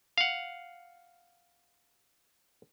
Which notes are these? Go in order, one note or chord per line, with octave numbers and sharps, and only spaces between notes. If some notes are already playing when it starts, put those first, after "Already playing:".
F5 F#5